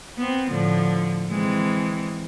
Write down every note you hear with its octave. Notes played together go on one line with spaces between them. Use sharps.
B3 C4
A2 D3 F3
E3 G#3 C4